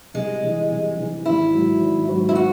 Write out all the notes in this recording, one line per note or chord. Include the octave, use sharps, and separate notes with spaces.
C2 G#3
C3 E3
C2
C3 E3
G#1 E4
G#2 F#3 C4 F#4
G#1
G#2 F#3 C4 F#4
E4
F#4